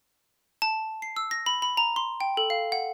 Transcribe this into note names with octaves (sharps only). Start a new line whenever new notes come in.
A5
C7
E6
A#6
B5
B5
A#5
C6
G5
A4
F5
F#5